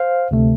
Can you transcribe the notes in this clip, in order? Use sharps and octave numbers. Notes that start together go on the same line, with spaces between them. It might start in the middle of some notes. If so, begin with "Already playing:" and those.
Already playing: C5 F5
D2 C3 A3